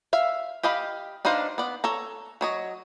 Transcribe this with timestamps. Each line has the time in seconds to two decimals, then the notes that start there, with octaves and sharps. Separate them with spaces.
0.13 E5 F5
0.63 G4 D#5 F5 B5
1.25 D4 D#4 B4 C5 F5
1.58 B3 D5
1.84 A4 C#5 A#5
2.41 F#3 C#5 D#5